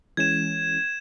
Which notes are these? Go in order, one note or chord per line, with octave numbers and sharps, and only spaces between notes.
E3 G#3 C#4 G#6 E7